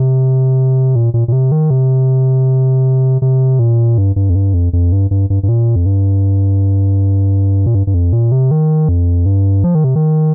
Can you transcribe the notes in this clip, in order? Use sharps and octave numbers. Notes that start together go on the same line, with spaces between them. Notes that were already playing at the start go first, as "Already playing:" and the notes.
Already playing: C3
A#2
A#2
A#2
C3
D#3
C3
C3
A#2
G2
G2
F2
G2
F2
F2
G2
G2
G2
G2
A#2
F2
G2
A#2
G2
G2
F2
A#2
C3
D#3
F2
G2
F3
D#3
C3
D#3